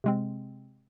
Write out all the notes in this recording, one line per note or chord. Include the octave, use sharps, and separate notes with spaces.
C3 G#3 C4